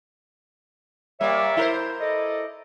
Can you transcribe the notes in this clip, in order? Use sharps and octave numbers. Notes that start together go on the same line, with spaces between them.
G3 A#3 C#5 D5 E5
E4 A#4 C5
A4 D5 D#5